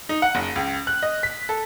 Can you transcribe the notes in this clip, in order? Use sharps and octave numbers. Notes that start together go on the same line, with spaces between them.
D#4
F#5
F#1
C#2
F#6
D#5
B6
A4